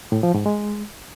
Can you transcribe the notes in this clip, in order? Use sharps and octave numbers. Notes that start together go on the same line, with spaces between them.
A2
F3
G#2
G#3